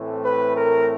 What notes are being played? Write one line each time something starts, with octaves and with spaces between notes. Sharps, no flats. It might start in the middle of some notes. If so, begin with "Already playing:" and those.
Already playing: A2 E3 A3 C4
B4
A#4